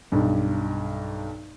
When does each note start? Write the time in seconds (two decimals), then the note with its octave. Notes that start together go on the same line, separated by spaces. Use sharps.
0.12 B1 G2